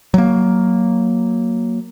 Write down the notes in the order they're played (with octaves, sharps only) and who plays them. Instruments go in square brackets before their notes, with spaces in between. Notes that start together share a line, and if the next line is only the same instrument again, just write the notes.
[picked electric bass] F#3 A#3